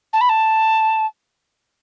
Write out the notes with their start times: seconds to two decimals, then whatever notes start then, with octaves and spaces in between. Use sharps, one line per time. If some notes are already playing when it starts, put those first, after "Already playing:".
0.13 A5
0.21 B5
0.29 A5